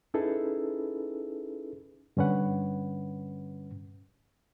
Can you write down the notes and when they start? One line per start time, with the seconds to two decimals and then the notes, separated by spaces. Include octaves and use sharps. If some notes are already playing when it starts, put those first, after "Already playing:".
0.14 C#4 D#4 E4 G#4 A4 B4
2.17 G2 D3 C#4 B4 F#5